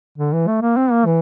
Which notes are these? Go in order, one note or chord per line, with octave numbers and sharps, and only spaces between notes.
D3
E3
A3
A#3
C4
A#3
E3